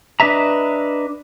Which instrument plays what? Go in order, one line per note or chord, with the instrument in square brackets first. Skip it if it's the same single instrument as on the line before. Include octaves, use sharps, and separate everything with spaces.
[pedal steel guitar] D4 B4 D#5 E5 A#5